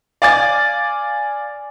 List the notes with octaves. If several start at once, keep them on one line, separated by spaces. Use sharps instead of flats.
D5 F5 G#5 D6 A6